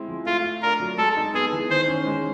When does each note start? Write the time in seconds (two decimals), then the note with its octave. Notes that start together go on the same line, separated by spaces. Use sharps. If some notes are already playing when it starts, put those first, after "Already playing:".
Already playing: G#3 C4 E4
0.09 F3
0.26 A3 F4
0.44 F4
0.62 D4 A#4
0.80 F#3
0.98 G#3 A4
1.16 D#4
1.34 B3 G#4
1.52 E3
1.69 D#3 C5
1.88 C#4
2.06 G#3